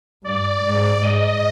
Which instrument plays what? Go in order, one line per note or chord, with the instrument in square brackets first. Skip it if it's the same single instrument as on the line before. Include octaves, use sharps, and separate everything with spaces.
[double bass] G2 [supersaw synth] D5
[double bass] G#2
[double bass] G#2 [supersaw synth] D#5